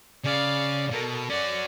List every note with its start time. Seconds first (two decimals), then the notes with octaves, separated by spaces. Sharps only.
0.24 C#3 D5 F5
0.91 B2 A4 A#4
1.30 C#4 F#4 D5